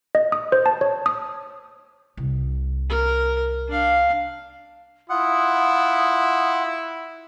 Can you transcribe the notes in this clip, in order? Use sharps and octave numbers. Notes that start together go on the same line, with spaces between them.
D#5
D#6
C5
A5
C#5
D#6
C2
A#4
D4 F5
E4 F4 F#5 D#6